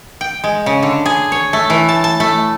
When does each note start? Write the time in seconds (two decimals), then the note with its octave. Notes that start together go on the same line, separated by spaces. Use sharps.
0.21 G5
0.44 G#3
0.66 C#3
0.83 D3
1.06 G#4
1.32 C#5
1.53 A3
1.70 E3
1.89 A5
2.04 A5
2.20 A3